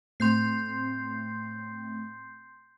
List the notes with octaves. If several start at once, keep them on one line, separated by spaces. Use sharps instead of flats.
A2 A3 C4 C6 G6 C7